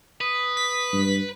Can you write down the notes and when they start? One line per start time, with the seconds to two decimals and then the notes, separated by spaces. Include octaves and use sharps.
0.21 B4 D#6
0.57 B6
0.93 G2